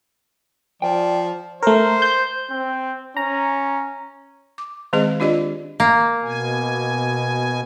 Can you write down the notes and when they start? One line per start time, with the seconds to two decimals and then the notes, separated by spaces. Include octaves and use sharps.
0.82 F3 D5 G5
1.62 A3 A#4 C5
2.02 G6
2.51 C4
3.17 C#4 A#5
4.58 D6
4.93 D#3 G#3 C4 G#4 D#5 F5
5.20 D4 F4 G4 D5 D#5
5.80 A#3
6.23 B2 G#5